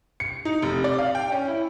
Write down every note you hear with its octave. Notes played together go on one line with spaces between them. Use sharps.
C#7
D#4
F1
D5
F5
G5
C#4
E4